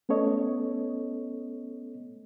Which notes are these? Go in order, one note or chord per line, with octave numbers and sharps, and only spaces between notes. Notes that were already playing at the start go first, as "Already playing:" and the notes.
A3 B3 C#4 A4 C#5 D#5